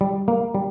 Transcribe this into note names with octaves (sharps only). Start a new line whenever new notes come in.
G3
A#3
G3